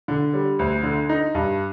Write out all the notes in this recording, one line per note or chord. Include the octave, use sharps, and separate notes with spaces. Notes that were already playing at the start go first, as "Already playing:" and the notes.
D3
G3
D2
D3
D#4
G2